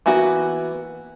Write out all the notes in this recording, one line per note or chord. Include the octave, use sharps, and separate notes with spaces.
E3 A#3 B3 F#4